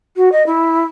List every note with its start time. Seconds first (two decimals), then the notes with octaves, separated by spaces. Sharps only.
0.16 F#4
0.32 D#5
0.46 E4